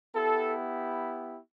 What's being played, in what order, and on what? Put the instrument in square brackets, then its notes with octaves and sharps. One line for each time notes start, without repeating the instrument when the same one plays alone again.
[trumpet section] B3 E4 G4 A4